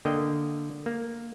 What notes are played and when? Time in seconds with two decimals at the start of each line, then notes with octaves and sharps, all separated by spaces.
0.05 D3 A#3 D#5 G5
0.86 A#3